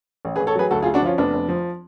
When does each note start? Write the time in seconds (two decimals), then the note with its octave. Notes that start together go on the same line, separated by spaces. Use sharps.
0.25 A1
0.36 G#4 B4
0.40 A1
0.47 A4 C#5
0.55 F#3 G#4 B4
0.71 D2 F#4 A4
0.82 F4 G#4
0.86 D2
0.94 D4 F#4
1.02 F3 C#4 F4
1.18 F1 B3 D4
1.33 F1
1.49 F3